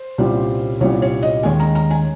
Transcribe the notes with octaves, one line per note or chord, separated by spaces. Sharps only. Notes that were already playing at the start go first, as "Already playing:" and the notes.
Already playing: C5
C2 A#2 G3 C#4
C2 A#2 G3 C#4 C#5
C#5
D#5
D#2 D#3 G#3 C#4 G#5
A#5
A#5
G#5